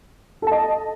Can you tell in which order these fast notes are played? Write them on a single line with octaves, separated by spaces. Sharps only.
A4 A5 D#5